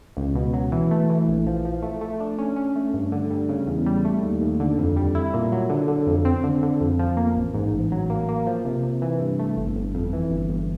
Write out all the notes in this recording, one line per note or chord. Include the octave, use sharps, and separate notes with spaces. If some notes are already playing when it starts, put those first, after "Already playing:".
C#2
B2
F#3
E3
A3
E3
A#1
F3
F3
A3
A3
D4
C#4
C#4
A3
G2
D3
G3
C#3
E2
G3
A3
D#2
D#2
D3
F2
G3
E4
A#2
F#3
D3
D3
F2
C4
D3
D3
F2
F3
A#3
A1
G#2
A1
F#3
A#3
A#3
F3
C3
C3
E3
G2
A3
G1
G1
F2
E3
G1
G1